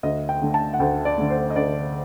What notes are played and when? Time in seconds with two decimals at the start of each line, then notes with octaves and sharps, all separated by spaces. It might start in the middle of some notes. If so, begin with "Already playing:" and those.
0.03 D2 D#5
0.29 G5
0.42 D3 A3
0.54 A5
0.74 F#5
0.80 D2 G5
1.05 D5
1.18 D3 A3
1.30 C5
1.50 D#5
1.56 D2 D5